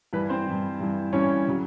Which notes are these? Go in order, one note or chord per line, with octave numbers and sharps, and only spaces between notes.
G2 E3 B4
C4 C5
G2 E3
G2 E3
G2 E3 C#4 C#5
C#3 F#3